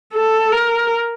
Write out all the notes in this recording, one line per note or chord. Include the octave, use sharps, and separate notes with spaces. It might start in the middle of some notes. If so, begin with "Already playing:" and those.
A4
A#4